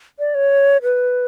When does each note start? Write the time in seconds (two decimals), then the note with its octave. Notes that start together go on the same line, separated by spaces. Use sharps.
0.19 D5
0.35 C#5
0.83 B4